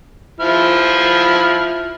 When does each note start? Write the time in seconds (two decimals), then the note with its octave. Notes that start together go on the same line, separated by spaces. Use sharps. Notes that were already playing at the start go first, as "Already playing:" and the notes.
0.40 F3 E4 F6